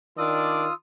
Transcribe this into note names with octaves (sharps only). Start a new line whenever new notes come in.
D#3 D4 F4 D5 D#6 E6